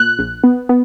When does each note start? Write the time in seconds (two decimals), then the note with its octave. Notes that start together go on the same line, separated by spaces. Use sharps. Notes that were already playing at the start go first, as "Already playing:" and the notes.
Already playing: A#2 F#6
0.19 A#1
0.44 B3
0.69 B3